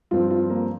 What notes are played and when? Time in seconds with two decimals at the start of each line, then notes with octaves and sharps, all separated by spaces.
0.11 G2 F3 C4 F4
0.31 F4
0.49 A#3